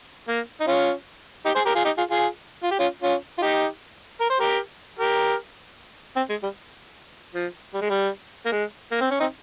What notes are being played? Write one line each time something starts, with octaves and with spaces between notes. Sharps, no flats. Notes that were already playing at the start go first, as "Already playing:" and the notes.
A#3
D#4
C#4 F4
D#4 G4
G#4 C5
G4 A#4
F4 G#4
D#4 G4
F4 G#4
F4 G#4
F4
G4
C#4 F4
C#4 F4
F4
D#4 G4
A#4
C5
G4 A#4
G4 A#4
C4
G#3
G3
F3
G3
G#3
G3
A#3
G#3
A#3
C4
C#4
C4 D#4